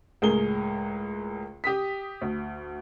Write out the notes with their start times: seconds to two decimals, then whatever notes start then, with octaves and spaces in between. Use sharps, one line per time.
0.22 C#2 A2 G#4 A#4 G7
1.64 G4 D#6 B6
2.22 D2